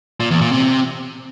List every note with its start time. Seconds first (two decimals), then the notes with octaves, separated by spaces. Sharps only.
0.20 A#2
0.30 E2
0.41 A#2
0.52 C3